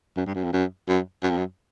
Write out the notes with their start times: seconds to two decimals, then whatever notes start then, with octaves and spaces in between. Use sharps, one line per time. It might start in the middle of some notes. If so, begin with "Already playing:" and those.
0.17 F#2
0.26 G2
0.35 F#2
0.43 F2
0.53 F#2
0.89 F#2
1.23 F#2
1.30 F2
1.38 F#2